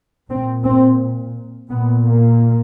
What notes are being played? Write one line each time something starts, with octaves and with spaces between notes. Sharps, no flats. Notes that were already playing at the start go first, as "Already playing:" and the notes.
A#2 C4
C4
A#2 B3
A#3